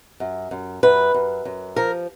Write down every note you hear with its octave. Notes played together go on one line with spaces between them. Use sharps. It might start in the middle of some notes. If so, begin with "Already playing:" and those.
F#2
F#2
F#2 B4
F#2
F#2
F3 A#4